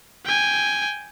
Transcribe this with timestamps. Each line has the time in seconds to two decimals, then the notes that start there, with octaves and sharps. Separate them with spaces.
0.25 G5 G#5